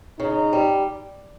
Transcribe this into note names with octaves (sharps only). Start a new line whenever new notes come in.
C#3 D#4
G3